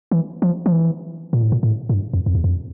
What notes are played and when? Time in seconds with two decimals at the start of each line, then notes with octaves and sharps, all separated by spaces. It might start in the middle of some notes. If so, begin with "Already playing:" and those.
0.11 E3
0.42 F3
0.66 F3
0.72 E3
1.33 A#2
1.43 A2
1.52 A#2
1.63 A2
1.89 A2
1.94 G2
2.14 F2
2.26 F2
2.35 E2
2.44 F2